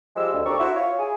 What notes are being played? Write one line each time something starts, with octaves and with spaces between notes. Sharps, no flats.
F3 G3 G#3 E6
D2
D#2 C4 D4 A4 A#5 C#6
E4 F#4 C5 E5
F4 C#5
E4 G#4 G#5